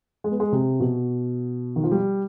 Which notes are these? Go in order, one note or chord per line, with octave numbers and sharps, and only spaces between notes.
G#3
B3
G#3
C3
B2
D#3
F3
G3